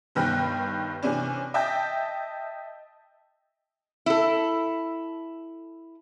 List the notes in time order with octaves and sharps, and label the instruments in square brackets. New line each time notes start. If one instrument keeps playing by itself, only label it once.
[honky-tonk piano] G1 G2 D#3 B4 G5 F#6
C3 E3 C#4 D4
D#5 E5 G5 A5 G6
[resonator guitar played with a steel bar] E4 A4